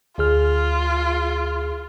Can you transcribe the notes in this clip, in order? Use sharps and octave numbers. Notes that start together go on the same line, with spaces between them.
D2 F4 G#4 F6